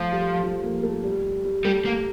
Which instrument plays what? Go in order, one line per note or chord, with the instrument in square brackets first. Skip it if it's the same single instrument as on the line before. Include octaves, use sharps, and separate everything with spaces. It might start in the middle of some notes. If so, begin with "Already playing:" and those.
Already playing: [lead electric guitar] F3 [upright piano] A3
[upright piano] G3
F3
A#3
A3
G3
G3
[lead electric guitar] G3 [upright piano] A3
[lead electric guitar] A#3